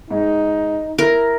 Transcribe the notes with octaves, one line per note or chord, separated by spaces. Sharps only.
G#2 D#4
E4 A#4